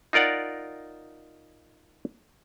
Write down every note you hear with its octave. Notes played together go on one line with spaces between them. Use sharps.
D#4 F4 A#4 D5 F#5